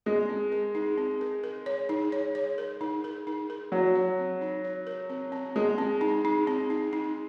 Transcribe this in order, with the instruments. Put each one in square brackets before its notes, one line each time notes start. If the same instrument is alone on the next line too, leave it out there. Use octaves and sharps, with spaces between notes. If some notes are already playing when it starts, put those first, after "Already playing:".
[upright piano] G#3 [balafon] A#4
[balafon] C4
A#4
D#4
C4
A#4
A#4
C#5
D#4
C#5
C#5
A#4
D#4
A#4
D#4
A#4
[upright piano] F#3 [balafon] A#4
[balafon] C#5
C4
D#4
C#5
A#4
C4
C4
[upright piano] G#3 [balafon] A#4
[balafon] C4
D#4
D#4
C4
D#4
D#4